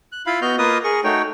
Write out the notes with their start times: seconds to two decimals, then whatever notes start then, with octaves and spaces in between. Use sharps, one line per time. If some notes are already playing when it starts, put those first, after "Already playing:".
0.12 F#6
0.26 E4 F4 F5 B5
0.42 B3 F#4 D#5 F6 G6
0.58 A#3 F4 A#4 B4 D#5 D#6
0.84 G#4 A#4 C#6
1.04 A3 D#4 F#4 C#5 G5